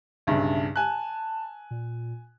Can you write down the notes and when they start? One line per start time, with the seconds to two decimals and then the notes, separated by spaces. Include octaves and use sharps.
0.27 B1 G2 C#3 E5
0.76 G#5 A5 F#6
1.71 A#2